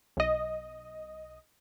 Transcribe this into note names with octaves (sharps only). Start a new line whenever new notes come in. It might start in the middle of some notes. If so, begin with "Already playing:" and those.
B1 D#5